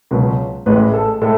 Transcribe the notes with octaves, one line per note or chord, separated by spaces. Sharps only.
C#2 B2 F#3
A1 A2 G#3 B4
A4
A2 G#3 A4